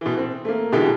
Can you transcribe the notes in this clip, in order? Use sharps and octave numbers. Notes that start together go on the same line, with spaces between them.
B2 E3
C4
A3 A#3
B2 D3 E3 G#3 D#4 G4